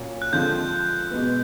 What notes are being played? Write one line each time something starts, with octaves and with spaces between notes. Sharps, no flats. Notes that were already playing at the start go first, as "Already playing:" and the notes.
Already playing: A#2 F#3 A#3 C#4
F#6
D3 F3 G#3 C4 G6
B2 G#3 B3